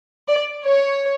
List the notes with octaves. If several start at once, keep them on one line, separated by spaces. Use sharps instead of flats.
D5
C#5